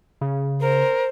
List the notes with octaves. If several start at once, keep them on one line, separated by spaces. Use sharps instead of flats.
C#3
A#4 C5